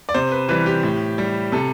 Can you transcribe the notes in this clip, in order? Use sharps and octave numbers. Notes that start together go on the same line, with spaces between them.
D5
C3 C5
B4
E3 G3 B4
G4
A2
G3
C3 A4